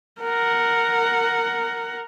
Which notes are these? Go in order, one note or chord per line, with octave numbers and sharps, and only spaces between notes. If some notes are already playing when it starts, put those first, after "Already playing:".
A#4 F#5